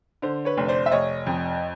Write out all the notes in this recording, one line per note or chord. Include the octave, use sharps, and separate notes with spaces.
D3 C5
B4 C#5
F1
C5 D5
E5
F1 C#5 D#5
F2